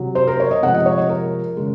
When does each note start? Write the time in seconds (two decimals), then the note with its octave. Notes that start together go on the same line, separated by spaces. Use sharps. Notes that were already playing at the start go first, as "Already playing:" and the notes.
Already playing: C3 F#3
0.15 C5
0.27 A#4
0.40 C#5
0.51 D#5
0.63 C3 F3 G#3 F#5
0.74 D#5
0.86 C#5
0.98 D#5
1.09 A#4
1.57 C#3 G#3